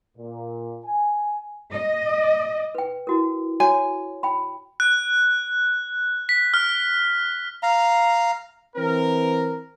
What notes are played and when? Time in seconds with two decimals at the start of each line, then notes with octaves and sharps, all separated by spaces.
0.17 A#2
0.86 G#5
1.72 D#5
2.75 B4 G5
3.07 E4 F#4 A#4
3.60 F#4 C#5 G#5
4.23 G5 B5
4.80 F#6
6.29 B6
6.54 F6
7.63 F5 A#5
8.76 E3 C4 A#4